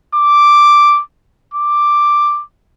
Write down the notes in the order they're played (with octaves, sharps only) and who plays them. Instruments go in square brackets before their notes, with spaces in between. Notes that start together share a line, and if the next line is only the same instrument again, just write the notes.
[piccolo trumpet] D6
D6